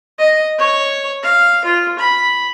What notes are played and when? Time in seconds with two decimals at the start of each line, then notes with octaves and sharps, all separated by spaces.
0.18 D#5
0.58 C#5
1.23 F5
1.65 F4
1.99 B5